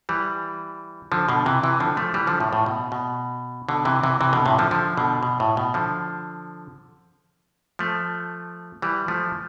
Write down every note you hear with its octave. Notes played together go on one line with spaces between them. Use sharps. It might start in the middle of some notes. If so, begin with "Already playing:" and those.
E3 G3
D3 F3
B2 D3
C3 E3
C3 E3
D3 F3
F3 A3
E3 G3
D3 F3
A2
A2
B2
B2
B2 D3
C3 E3
C3 E3
C3 E3
B2 D3
A2 C3
D3 F3
D3 F3
B2 D3
B2
A2
B2
D3 F3
F3 A3
E3 G3
F3 A3